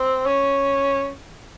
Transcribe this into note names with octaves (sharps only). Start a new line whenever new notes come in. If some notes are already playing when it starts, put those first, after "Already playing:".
Already playing: C4
C#4